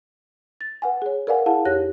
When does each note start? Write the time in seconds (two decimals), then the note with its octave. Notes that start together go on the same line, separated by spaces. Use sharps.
0.61 A6
0.82 B4 F#5 G#5
1.02 G#4 C#5
1.27 A#4 B4 D5 F5 F#5 G#5
1.46 E4 G#4 F5 F#5 A5
1.65 F2 G4 C#5 F#6 A#6